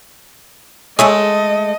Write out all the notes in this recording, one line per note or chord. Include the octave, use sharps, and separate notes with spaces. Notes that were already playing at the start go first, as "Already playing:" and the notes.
G#3 A3 G#4 A4 C#5 D#5 E5